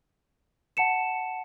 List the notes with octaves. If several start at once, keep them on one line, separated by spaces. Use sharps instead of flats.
F#5 A5 C#7 E7